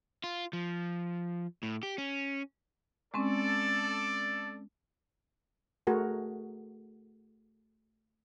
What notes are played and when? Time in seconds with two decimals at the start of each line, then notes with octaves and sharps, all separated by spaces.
0.24 F4
0.53 F3
1.63 A2
1.83 G4
1.98 C#4
3.14 G#3 C4 C#4 A4 D5
5.87 A3 F#4 G#4 A#4